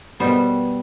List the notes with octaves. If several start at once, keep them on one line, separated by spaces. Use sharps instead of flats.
B2 G3 B3 C5